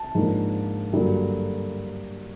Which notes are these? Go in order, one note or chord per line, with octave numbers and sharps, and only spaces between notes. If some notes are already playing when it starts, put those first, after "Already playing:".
Already playing: A5
G#2 F3 A#3 D4
G2 D3 F#3 A#3